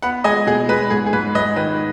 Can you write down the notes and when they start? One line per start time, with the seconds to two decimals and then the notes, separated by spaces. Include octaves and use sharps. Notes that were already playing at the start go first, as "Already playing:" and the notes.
0.02 B3 F#5 B5
0.24 G#3 D#5 G#5
0.47 B2 G#4
0.69 G#3 B4
0.90 G#2 G#4
1.06 G#4
1.13 G#2 B4
1.35 G#2 B4 D#5
1.56 D#3 B4